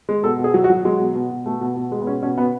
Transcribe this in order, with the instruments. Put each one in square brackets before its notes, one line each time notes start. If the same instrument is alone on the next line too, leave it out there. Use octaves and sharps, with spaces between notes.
[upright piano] G#3
B2 A4
B2
G#4
F#3
F#4
F#3
F#3 G#3
B2
B2
B2
B2 A3
B2
B2
G#3
B3
B2 C#4
B2 C#4
B2 B3